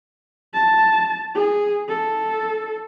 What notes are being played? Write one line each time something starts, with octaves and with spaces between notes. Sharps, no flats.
A5
G#4
A4